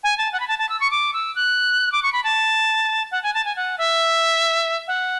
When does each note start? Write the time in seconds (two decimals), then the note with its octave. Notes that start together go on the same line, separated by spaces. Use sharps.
0.04 G#5
0.18 A5
0.33 F#5
0.40 B5
0.48 A5
0.59 A5
0.69 E6
0.80 C#6
0.91 D6
1.14 E6
1.35 F#6
1.92 D6
2.03 C#6
2.13 B5
2.24 A5
3.11 F#5
3.23 G#5
3.34 A5
3.45 G#5
3.56 F#5
3.78 E5
4.88 F#5